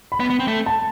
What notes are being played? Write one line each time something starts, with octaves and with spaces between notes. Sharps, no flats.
B5
B3
B3
C4
A3
A5